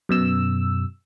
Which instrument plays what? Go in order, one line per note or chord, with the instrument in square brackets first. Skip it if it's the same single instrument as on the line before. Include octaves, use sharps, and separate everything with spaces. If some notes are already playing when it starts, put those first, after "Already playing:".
[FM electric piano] F#2 B2 E6